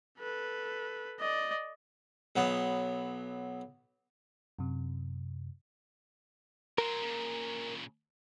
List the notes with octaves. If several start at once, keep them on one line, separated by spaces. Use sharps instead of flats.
A4 B4
D5 D#5
B1 F#3 B3
F#2 C3
F#3 A#4 C5
A#2 C#3